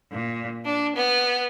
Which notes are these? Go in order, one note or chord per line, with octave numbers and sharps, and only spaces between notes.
A#2
D4
B3